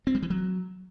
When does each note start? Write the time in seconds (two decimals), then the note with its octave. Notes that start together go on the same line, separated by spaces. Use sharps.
0.07 C4
0.15 G3
0.22 E3
0.30 F#3